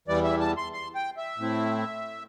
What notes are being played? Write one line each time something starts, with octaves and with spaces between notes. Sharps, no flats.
E2 E3 G3 D5
E5
A5
C6
C6
G5
E5
A2 A3 C4 E4